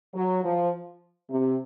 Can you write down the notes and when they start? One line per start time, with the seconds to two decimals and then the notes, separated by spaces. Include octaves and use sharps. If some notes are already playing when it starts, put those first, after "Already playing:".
0.14 F#3
0.43 F3
1.30 C3